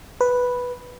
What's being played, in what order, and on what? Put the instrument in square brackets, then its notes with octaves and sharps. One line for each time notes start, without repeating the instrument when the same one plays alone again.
[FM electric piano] B4